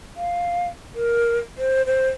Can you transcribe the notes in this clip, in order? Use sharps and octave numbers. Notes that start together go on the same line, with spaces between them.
F5
A#4
C5
C5